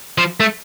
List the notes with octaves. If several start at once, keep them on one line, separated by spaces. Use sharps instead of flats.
F3
A3